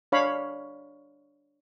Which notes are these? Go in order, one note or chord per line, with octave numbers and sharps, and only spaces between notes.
D4 C#5 F5 B5